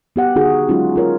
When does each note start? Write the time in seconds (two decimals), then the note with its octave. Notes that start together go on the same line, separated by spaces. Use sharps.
0.16 B3 G4 F#5
0.36 D3 D#4 F#4 G#4
0.68 F#3 G#3 C#4 D#4 F4 F#4
0.96 F4 A#4 C#5